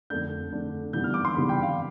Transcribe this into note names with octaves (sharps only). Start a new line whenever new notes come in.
F2 D3 A3 D4 G6
F2 D3 A3 D4
C3 E3 G3 B3 G6
F6
D6
C6
C3 E3 G3 B3 B5
G5
F5